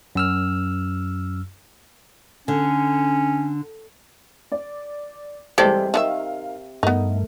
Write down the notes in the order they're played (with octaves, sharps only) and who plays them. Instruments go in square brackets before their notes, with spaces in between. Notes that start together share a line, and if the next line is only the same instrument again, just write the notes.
[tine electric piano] F#2 E6 F6
[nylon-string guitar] D3 [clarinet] C#4
[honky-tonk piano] D5
[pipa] C3 [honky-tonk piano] E3 G3 G#3 [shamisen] A4 D5
[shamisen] D#3 E4 E5 [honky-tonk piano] A#4 F5
[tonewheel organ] G2 [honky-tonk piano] A3 A#4 [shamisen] B3 D#4